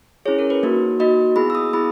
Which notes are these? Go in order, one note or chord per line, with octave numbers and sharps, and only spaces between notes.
C#4 E4 G#4 C#5
A#4
B4
A#3 D#4 F#4
A#3 D#4 F#4 D#5
B3 E4 G#4 B5
E6
D#6
B3 E4 G#4 B5